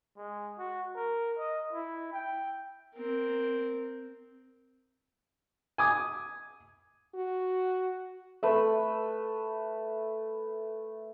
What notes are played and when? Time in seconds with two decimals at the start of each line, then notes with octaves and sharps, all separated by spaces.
0.17 G#3
0.58 F#4
0.95 A#4
1.38 D#5
1.73 E4
2.13 G5
2.95 C4 A#4
5.78 G#5 D6 D#6
7.15 F#4
8.43 A3 B4 E5